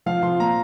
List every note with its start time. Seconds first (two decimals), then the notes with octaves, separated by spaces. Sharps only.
0.06 F3 F5
0.23 F3 C6
0.40 A#2 A#5